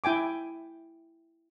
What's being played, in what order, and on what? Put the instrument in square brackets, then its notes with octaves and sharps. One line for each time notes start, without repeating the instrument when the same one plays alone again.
[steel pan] E4 G5 G#5 D6